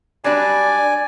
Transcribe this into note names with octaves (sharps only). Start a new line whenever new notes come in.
F#3 G3 D4 D5 G#5